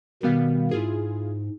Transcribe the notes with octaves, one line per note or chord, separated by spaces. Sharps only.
B2 D#3 G3 B3 F5
G#2 E4 F4 G#4